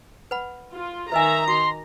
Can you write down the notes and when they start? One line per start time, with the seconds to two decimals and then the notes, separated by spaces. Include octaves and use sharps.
0.31 B4 F#5 B5
0.73 F4
1.12 D#3 B4 D#5 E5 G#5 A#5
1.48 F#4 C6 D6